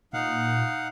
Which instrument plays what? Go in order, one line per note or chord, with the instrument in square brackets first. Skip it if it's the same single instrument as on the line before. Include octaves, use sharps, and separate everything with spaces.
[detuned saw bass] A#2 [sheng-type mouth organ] D#4 F5 F#5